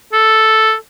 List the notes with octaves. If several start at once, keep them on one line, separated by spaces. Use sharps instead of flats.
A4